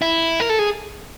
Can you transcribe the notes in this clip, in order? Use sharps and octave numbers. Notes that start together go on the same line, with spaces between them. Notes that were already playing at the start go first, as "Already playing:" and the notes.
E4
A#4
A4
G#4